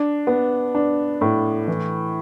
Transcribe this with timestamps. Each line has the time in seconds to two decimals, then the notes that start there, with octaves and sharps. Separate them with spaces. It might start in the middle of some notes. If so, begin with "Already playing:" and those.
Already playing: D4
0.27 B3
0.75 D4
1.21 A2
1.67 E3